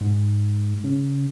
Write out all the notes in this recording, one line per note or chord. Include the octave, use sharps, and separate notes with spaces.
G#2
C#3